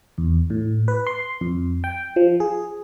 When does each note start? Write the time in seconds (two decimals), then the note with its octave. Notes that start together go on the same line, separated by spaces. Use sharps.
0.18 E2
0.50 A2
0.88 B4
1.07 C6
1.41 F2
1.84 G5
2.16 F3
2.40 G#4